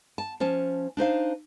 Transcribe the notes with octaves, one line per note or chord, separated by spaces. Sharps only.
A5
F3 C#4 A5
D4 D#4 C5 F5